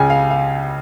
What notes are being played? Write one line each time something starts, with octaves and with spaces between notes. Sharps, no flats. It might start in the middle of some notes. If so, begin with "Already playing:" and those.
Already playing: C#2 C#3 G#5
F5
F5